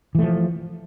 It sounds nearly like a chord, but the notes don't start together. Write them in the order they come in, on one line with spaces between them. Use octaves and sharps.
E3 A3 F3